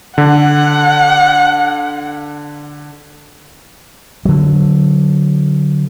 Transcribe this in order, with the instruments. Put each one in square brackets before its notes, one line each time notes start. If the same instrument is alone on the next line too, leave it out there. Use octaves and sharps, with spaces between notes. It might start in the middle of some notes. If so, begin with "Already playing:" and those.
[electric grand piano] D3 [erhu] F#5
[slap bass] D3 F#3